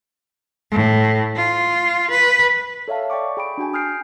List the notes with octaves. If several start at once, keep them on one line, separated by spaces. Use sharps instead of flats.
A2
F4
B4
A4 C#5 E5 F5 A5
D5 G5 C#6 D6
G#4 G5 B5 D7
D4 F#4 G5 G#5
D#6 F6 G6 C7 D7